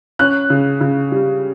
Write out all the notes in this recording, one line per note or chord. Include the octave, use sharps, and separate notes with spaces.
C#4 F#6
C#3
C#3
G3